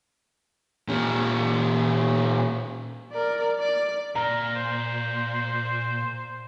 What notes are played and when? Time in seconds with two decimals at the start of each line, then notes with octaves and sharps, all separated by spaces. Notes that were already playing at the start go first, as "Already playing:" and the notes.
0.88 A#2 C#4
3.12 A#4 D5
3.60 D5
4.15 A#2 A#4 A#5
4.55 C5